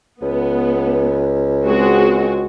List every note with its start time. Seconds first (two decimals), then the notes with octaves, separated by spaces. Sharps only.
0.22 C#2 B3
1.65 G#3 C4 F#4